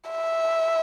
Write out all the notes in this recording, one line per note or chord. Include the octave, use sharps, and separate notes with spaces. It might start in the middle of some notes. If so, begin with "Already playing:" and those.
E5